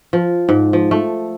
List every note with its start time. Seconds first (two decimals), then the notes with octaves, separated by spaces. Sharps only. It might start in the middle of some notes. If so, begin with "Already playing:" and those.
0.13 F3
0.49 G#2
0.73 F3
0.91 A3